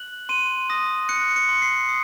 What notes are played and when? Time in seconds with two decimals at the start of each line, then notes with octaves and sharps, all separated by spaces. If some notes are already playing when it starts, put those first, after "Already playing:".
Already playing: F#6 F#7
0.29 C6 D#7
0.70 D#6 A#6
1.09 F#6 C#7
1.36 C#7
1.49 C6
1.62 C7
1.89 D#6